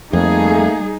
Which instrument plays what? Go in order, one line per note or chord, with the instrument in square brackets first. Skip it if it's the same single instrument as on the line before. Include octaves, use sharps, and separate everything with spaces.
[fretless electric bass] F2 [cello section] G3 G#4 [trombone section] A3 A#3 [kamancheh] D#4